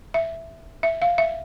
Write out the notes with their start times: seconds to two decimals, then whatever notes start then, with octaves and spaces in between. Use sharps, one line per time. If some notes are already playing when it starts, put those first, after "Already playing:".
0.14 E5
0.83 E5
1.02 F5
1.18 E5